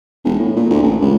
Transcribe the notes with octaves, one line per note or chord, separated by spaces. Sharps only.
E1
A2
A#2
D2
A1
C#2